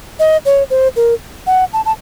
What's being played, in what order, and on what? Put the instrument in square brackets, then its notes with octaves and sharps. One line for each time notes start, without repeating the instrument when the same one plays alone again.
[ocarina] D#5
C#5
C5
A#4
F#5
A5
A5